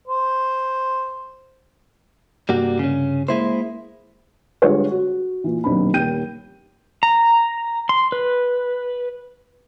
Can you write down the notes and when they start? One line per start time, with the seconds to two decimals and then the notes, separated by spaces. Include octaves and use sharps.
0.08 C5
2.49 G2 C3 G3 A#3 F#4
2.79 C#3 C#4
3.28 G#3 A#3 E4 C5
4.62 D3 G3 G#3 F4 G#4 C#5
4.91 F#4
5.44 A#2 E3
5.64 D#1 B1 C4 D4 B5
5.94 D#1 G5 G6 D#7
7.03 A#5
7.89 C6
8.12 B4